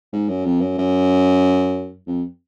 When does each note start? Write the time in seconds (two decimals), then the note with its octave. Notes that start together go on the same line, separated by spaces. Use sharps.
0.13 G#2
0.28 F#2
0.45 F2
0.61 F#2
0.78 F#2
2.07 F2